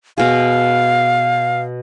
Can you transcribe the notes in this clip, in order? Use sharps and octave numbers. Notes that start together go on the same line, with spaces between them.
B2 G#4 F5